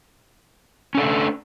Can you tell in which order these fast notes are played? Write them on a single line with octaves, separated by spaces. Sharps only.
C#4 A4 D4 A3